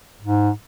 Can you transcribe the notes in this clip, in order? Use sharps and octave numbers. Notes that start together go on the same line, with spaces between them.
G#2